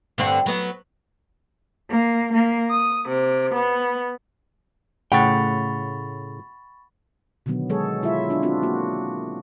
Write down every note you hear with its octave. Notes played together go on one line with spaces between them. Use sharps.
G2 D3 C4
F#3 B3
A#3
A#3
D#6
C3
B3
A2 C#3 A3 F#5 G5 B5 C#6 A6
B2 D3 D#3 F#3 B3
F#3 G#3 G#4 A4 C#5
G#3 E4 F4 C#5 E5
D4 F4
C4 D4 F4 F#4
A#3 F#4